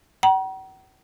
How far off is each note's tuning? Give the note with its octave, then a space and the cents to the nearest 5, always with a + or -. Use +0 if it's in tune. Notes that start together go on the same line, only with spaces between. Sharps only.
F#5 +45 A#5 +35